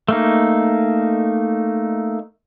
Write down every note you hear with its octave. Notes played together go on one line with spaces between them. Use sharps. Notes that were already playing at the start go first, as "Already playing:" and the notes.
A3 A#3 D#4